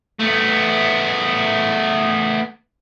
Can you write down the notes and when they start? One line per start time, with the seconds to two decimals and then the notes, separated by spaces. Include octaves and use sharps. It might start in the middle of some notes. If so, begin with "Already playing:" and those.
0.20 A3 B3